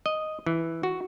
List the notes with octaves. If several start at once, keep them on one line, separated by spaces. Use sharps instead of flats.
D#5
E3
F#4